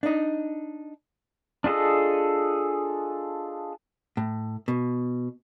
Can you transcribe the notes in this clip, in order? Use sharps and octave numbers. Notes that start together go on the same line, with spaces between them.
D4 D#4
D4 F4 G#4 A4 D#5
A2
B2